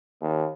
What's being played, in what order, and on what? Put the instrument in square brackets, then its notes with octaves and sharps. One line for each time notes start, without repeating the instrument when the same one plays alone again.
[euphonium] D#2